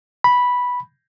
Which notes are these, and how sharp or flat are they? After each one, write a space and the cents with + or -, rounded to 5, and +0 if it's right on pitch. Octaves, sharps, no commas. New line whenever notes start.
B5 -5